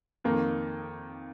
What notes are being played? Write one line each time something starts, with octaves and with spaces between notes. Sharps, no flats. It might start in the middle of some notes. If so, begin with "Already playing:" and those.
F2 D#3 A#3